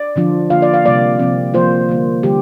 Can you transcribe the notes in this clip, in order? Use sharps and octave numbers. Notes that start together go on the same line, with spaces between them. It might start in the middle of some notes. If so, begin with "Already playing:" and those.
Already playing: D5
D3 F3 D4 F4
D3 A#3 F4 F5
D5
F5
C3 G3 A#3 D5
C3 F3 C4
F3 A#3 F4 C5
D3 G3 A#3
D3 G3 G4